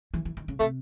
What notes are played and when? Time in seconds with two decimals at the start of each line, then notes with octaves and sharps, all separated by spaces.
0.14 E3
0.25 E3
0.37 D#3
0.48 C#3
0.60 C3 A3